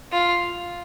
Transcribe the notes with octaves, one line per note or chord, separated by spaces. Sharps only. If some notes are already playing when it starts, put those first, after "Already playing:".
F4